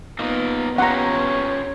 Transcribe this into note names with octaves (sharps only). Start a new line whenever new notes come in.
A#3 B3 D#4 F4
C#4 F4 G4 C#5 F#5 A#5